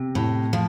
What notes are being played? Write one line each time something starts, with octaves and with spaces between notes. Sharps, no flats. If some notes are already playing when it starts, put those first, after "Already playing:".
Already playing: C3
A2
F3